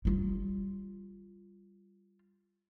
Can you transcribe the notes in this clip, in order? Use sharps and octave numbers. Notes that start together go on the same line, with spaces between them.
G3 F4